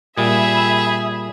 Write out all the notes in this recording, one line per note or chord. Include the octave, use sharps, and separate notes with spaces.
A#2 G3 G#4 E5 B5